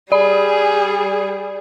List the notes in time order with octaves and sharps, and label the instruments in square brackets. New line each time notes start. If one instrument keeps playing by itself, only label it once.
[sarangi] G3 [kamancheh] G#4 [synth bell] D5 B5